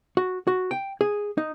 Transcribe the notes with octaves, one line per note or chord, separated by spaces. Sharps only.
F#4
F#4
G5
G#4
D#4